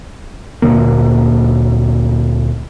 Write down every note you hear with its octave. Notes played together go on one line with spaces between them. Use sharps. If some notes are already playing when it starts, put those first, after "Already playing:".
D2 A#2 D3 A#3